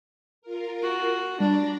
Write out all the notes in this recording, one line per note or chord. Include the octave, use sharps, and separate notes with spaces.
F4 A#4
F#4
G3 D4 D5 A#5